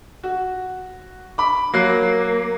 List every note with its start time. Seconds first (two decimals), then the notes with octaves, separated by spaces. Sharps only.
0.23 F#4
1.38 B5 D6
1.74 F#3 A#3 F#6 C7